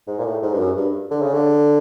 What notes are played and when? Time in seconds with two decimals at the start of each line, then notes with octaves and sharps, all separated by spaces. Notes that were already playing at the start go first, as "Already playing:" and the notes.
0.08 G#2
0.19 A#2
0.25 A2
0.43 G#2
0.53 G2
0.59 F#2
0.77 G2
1.11 D3
1.22 C#3
1.34 D3